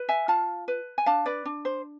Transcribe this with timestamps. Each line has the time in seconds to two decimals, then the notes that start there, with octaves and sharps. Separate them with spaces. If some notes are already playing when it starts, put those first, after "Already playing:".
Already playing: B4
0.09 E5 G#5
0.28 F4 F5 A5
0.68 B4
0.98 G#5
1.06 D4 F5 A5
1.26 B4 D5
1.45 D4
1.65 C5